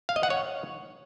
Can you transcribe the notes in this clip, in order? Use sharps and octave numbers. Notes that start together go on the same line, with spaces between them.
F5
D#5
F#5
C#5